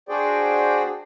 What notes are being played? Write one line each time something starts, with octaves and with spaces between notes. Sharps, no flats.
D4 F#4 G#4 C5 D5 G5